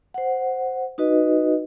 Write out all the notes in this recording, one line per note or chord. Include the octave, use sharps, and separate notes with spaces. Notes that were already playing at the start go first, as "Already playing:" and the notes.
C5 F#5
D#4 F#4 B4 D#5